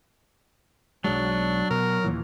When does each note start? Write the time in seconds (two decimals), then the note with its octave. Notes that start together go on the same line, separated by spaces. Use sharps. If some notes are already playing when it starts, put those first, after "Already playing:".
1.04 B1 F#3 G#3 D4
1.70 B2 A#4
2.04 D#2 A#2 E3